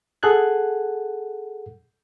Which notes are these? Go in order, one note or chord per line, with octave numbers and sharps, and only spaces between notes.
G#4 A4 F#5 F#6 G#6